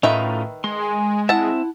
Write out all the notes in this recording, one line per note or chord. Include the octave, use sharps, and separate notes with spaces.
A2 D#3 C#4 D#4 F4 B4 E5
G#3 C6
G#5
C4 E4 E5 F#5 A5